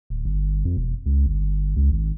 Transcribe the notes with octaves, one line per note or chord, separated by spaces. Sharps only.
D1
G1
F2
E1
C#2
G1
C#2
G#1